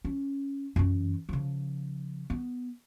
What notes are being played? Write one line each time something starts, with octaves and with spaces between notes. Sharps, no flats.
C#4
F#2 E3
C#3 F3
B3